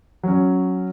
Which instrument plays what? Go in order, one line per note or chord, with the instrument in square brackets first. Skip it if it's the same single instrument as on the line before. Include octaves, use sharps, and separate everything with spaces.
[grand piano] F#3 C#4